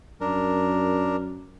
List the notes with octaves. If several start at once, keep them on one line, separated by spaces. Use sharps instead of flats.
F#2 D4 A#4